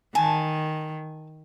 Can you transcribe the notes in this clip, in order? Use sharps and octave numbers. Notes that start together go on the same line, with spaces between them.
D#3 G#5 A5